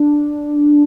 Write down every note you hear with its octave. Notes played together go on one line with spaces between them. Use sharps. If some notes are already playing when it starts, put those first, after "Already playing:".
Already playing: D4